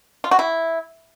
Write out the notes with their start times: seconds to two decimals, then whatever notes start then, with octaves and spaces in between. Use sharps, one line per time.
0.24 F4
0.31 F#4
0.39 E4